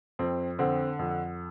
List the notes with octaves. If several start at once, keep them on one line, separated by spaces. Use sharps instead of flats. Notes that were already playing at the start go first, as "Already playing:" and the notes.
F2 C4
D3 C4
F2